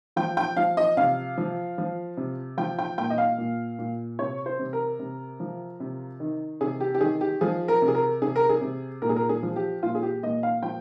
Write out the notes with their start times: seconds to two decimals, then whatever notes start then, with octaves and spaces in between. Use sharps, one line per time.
0.16 F3 G5
0.37 G5
0.57 F3 F5
0.77 D#5
0.97 C3 F5
1.38 F3
1.78 F3
2.17 C3
2.57 F3 G5
2.79 G5
2.98 A#2 G5
3.10 D#5
3.18 F5
3.38 A#2
3.79 A#2
4.19 C3 C#5
4.46 C5
4.59 C3
4.73 A#4
4.99 C3
5.40 F3
5.80 C3
6.20 D#3
6.61 C3 G#4
6.80 G4
6.95 G4
7.01 D#3 G#4
7.21 G4
7.41 F3 G#4
7.68 A#4
7.82 C3
7.88 G#4
7.94 A#4
8.22 C3 G#4
8.36 A#4
8.49 G#4
8.61 C3
9.02 A#2 A#4
9.09 G#4
9.16 A#4
9.29 G#4
9.43 F3
9.56 G4
9.83 A#2 F4
9.95 G#4
10.03 G4
10.23 A#2 D#5
10.43 F5
10.63 F3 G5